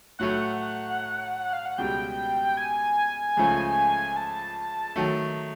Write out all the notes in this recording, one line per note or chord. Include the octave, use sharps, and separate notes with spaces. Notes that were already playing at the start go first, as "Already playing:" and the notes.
A2 F#3 A3 F#5
F5
F#5
C#2 B2 G3 G5
G#5
C#2 C#3 F3 A3
A5
D#3 F#3 A3